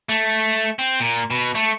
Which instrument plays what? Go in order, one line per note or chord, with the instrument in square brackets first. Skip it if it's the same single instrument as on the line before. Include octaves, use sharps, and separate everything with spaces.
[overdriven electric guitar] A3
C4
A#2
B2
A3